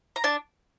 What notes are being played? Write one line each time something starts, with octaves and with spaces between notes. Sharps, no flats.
A#5
D4 A5